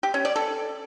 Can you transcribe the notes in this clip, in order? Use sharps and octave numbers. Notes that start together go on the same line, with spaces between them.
G4
C#4
D5
A4